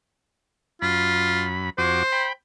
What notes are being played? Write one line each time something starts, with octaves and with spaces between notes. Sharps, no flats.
F#2 F4 B5
F2 F#4 C5 D6
G5 B5